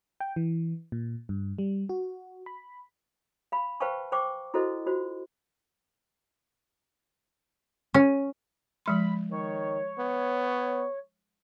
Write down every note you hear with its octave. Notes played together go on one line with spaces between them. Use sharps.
G5
E3
A#2
G2
G3
F#4
B5
F5 B5
B4 C5 F5 G5 A5 C#6
C5 G5 C#6 D6
E4 F#4 A4 C5 D#5
F4 F#4 C5
C#4
F3 G#3 B5 C6
D#3 C#5
B3